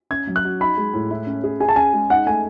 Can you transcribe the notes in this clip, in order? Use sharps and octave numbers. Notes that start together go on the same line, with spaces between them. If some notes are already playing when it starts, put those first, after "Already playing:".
C#4 G#6
F#3
F#6
F#4
D#4 B5
G#3
A2
E4
C#4
G#4
G#4 G#5
A5
C#4 G#5
G#3
D#4 F#5
A3 G#5